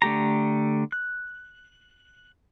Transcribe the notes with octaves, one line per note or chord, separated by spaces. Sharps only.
D3 A3 G4 A#5
F#6